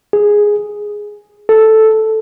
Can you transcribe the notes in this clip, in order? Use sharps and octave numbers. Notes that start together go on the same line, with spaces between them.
G#4
A4